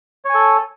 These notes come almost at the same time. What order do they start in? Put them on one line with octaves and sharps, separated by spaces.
C#5 G#5 A4